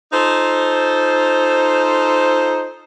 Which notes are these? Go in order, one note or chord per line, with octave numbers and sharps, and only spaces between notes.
D#4 F4 A4 C5